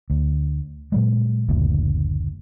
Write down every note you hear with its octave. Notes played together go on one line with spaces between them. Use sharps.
D2
A#2 F#3 G#3
F#1 D2 A#2